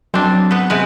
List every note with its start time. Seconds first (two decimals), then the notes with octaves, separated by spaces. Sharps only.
0.14 F#3 C4 D4
0.51 B3 B4
0.70 C3 G#3 B4